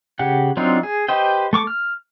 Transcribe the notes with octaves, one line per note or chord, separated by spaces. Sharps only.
C#3 G4 F#5
F#3 C4 D4 D#4 F4
G#4
G4 B4 C5 D#5 G5
A3 C#6 D6
F6